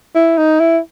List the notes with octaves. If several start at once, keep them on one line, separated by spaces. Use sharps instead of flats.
E4
D#4
E4